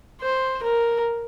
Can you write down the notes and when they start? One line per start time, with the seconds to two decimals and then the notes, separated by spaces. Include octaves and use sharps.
0.22 C5
0.63 A#4